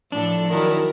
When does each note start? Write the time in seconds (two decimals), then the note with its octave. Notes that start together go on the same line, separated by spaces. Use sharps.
0.12 A2 F3 D4 A4
0.49 D#3 F#3 E4 A#4